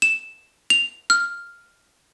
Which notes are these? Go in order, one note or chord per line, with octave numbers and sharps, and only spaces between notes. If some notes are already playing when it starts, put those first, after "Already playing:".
E7
F7
F6